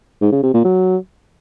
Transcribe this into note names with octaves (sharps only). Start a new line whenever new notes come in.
G#2
C#3
C3
A#2
F#3